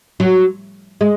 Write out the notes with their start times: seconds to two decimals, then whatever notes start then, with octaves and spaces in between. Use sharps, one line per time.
0.20 F#3
1.01 G#3